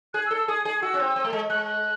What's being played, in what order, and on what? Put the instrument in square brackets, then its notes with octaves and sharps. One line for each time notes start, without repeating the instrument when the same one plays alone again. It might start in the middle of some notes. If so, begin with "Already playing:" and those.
[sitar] G#4 [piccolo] F#6
[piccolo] E6
[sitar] A4
[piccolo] E6
[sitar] G#4 [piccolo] D#6
[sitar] G#4
[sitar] F#4 [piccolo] E6
[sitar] C#4
C4
C4
A3
G#3
[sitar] G#3 [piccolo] F#6
[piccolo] F#6